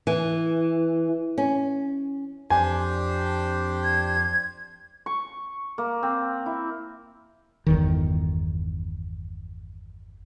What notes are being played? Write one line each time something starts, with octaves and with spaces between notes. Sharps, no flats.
E3
C#4
F2 D4 G4 C5 G#5
G#6
C#6
A#3
C4
E4
G1 E2 D#3